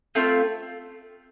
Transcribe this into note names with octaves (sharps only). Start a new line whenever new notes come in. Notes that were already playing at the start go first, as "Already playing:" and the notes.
A3 C4 F4